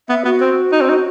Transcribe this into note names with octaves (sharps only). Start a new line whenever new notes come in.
B3 E5
B3 F#4
C4
D#4
C4
D#4